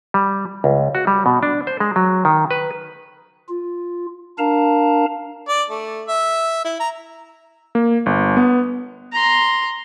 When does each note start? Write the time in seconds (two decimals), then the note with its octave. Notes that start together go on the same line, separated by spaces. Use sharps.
0.14 G3
0.64 C#2
0.95 F#4
1.07 G3
1.26 B2
1.43 D4
1.67 C5
1.80 G#3
1.96 F#3
2.25 D#3
2.51 B4
3.49 F4
4.38 D4 A#4 F5 A5 A#5
5.48 D5
5.70 A3
6.08 E5
6.65 E4
6.80 A#5
7.75 A#3
8.06 G1
8.37 B3
9.12 A#5 C6